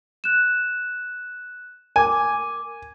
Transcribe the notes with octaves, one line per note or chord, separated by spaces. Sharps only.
F#6 E7
A#4 G#5 D6